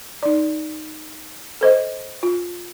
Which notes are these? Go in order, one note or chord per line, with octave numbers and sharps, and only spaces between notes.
D#4 D5
A4 C5 D#5
F4